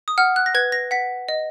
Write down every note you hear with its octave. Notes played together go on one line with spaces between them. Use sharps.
D#6
F#5 F6
F#6
A#6
B4 G#6
A#6
F#5 B6
D#5